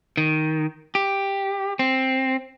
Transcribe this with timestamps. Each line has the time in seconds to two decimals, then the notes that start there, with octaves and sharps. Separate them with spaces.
0.17 D#3
0.95 G4
1.79 C4